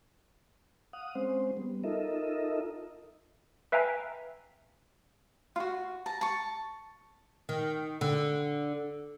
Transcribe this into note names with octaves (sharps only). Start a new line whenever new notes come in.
F5 F#5 D#6
G#3 C4 C#4 C5
G3 B3
D#4 F4 A4 A#4 D#5 E5
B4 E5 F5 G5 G#5 A#5
F4 F#4
A5 A#5
A5 C#6
D#3
D3